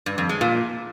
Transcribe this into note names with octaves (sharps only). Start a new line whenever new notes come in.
G2
F2
G#3
A#2